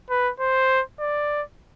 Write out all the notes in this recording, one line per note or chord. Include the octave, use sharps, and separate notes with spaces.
B4
C5
D5